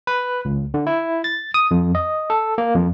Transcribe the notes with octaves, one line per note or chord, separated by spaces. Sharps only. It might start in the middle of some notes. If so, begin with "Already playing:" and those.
B4
C#2
D3
E4
A6
D#6
F2
D#5
A4
A#3
F2